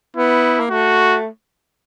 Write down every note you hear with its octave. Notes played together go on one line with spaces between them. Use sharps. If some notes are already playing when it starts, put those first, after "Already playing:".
B3 E4
A#3
A3 F#4